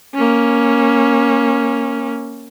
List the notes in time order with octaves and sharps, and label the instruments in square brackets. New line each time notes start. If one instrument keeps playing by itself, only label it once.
[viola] A#3 C#4